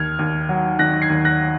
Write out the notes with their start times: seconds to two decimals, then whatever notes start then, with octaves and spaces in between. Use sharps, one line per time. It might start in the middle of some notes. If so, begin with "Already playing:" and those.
Already playing: D#2 F6 G#6
0.19 D#2
0.49 F#3
0.79 D#3 F#6 A#6
1.02 G#6 C7
1.10 D#2
1.25 F#6 A#6